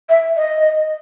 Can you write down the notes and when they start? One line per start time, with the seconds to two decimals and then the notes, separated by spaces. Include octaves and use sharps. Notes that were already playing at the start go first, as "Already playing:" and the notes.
0.09 E5
0.37 D#5